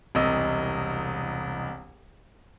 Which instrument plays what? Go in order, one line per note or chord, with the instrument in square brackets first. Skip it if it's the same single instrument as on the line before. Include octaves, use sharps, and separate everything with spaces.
[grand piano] E1 C2 C3 D#5 E6